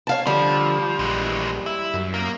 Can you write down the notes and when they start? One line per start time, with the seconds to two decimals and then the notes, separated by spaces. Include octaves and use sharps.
0.07 C#5 F5 A5
0.27 D3 F3 G3
0.99 A#1 E3 G#3
1.66 E4
1.94 F#2
2.14 A#3